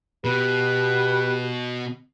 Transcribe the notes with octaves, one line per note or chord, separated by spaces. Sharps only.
B2 G4 B4